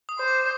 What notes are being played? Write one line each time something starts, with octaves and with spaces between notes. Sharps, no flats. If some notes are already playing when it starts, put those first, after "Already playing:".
D#6
C5
D6